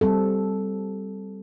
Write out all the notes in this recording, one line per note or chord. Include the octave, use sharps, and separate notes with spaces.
G3 C4 A4